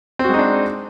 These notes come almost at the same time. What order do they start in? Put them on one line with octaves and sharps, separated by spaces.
C4 F#4 G#3 D#4 D4